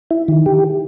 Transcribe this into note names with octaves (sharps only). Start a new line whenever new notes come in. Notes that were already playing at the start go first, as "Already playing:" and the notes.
E4
D#3
G4